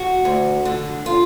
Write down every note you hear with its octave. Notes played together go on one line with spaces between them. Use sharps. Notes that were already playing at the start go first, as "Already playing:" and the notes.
Already playing: F#4
D2
D3
F4